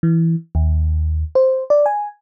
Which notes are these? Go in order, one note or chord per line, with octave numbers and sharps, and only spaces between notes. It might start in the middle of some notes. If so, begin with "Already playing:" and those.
E3
D#2
C5
D5
G#5